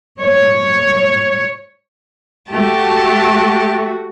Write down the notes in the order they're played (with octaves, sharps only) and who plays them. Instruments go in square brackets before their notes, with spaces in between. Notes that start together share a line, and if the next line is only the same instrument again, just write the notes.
[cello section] C#5
[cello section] A3 F#4 [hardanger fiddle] G4 A5